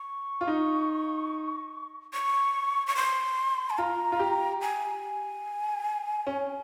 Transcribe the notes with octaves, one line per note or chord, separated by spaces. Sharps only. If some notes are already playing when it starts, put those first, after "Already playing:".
Already playing: C#6
F4
D#4
C#6
C#6
C6
G#5
F4 A#5
F4
G4
G#5
C#4